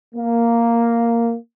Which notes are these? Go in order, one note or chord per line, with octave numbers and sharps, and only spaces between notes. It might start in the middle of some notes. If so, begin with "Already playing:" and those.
A#3